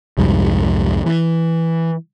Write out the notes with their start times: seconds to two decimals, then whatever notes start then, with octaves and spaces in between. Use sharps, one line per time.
0.18 C2 F2 G#2 G3
1.06 E3